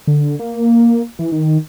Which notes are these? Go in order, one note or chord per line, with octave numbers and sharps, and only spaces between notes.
D3
A#3
E3
D#3